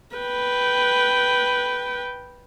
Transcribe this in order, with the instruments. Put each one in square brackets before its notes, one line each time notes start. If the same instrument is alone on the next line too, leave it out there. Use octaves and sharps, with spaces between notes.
[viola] B4 G5